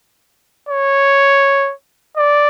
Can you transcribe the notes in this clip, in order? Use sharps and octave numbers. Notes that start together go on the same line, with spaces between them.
C#5
D5